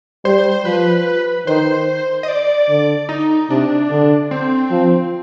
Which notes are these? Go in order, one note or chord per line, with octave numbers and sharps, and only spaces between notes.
G3 C5
C5
C5
F3 B4
D#3 C5
D#5
D5
D3
D#4
C3 D4
D3
C4
F3